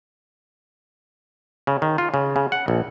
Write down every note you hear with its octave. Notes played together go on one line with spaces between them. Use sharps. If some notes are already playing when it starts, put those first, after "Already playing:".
C#3
D#3
F4
C#3
C#3
F#5
A#1